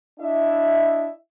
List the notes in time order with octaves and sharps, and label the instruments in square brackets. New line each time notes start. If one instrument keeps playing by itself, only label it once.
[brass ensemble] D4 E4 D#5 E5